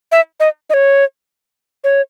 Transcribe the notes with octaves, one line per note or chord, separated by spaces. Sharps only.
E5
D#5
D#5
C#5
C#5